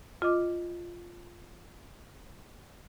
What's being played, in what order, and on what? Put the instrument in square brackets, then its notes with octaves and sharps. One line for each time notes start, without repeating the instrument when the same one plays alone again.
[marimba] F4 D#5 D6